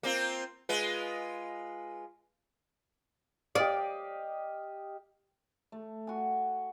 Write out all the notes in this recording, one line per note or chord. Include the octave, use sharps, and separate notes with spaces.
A#3 C4 F4
G#3 F4 B4
G4 D5 D#5 F5
A3
F#4 G#5